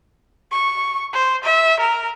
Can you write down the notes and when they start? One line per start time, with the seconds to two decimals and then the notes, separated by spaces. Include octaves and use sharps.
0.52 C#6
1.13 C5
1.44 E5
1.80 A#4